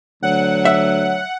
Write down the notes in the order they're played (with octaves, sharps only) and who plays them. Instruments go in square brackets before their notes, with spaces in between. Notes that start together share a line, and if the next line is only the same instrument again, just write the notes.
[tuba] D2 [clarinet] F#3 [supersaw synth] F#5
[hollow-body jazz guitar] E5